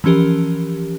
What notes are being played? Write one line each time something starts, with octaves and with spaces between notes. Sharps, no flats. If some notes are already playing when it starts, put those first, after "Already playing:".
E3 F3 C#4 G4 A#4